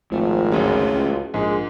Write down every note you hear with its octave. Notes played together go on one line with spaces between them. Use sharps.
G#1 F3 A3
A1 D2 C#3 F#3
C#2
A#1 G#2 G#3